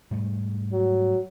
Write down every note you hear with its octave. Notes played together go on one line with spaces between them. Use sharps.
G#2 G3 A3
F#3